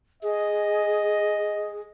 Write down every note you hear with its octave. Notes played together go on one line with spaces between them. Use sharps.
G#4 D#5